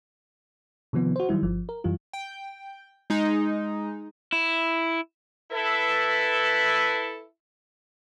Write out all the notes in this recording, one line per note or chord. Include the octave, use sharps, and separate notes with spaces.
C3 D#3 F3 B3
F#4 C5
D#3 F#3 G3 E4
G1 F3
A#4
F#2 E3 G3 F4
G5
G#3 D#4
E4
E4 A4 B4